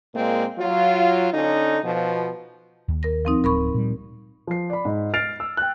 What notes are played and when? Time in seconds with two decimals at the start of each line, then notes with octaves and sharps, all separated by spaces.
0.14 A#2 G#3 A#3 C4
0.59 F#3 F4
1.33 D3 C#4 D#4
1.84 B2 F3
2.88 D#2
3.03 A#4 A#6
3.25 F3 C4 D#4
3.44 D1 A#4 B5 C#6
3.74 A#2 G3
4.47 F3 C7
4.70 D5 B5
4.85 G#2
5.14 F6 A6 C7 D7 F7
5.40 E6
5.57 G5 F#6